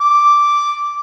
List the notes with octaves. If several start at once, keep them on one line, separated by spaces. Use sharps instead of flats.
D6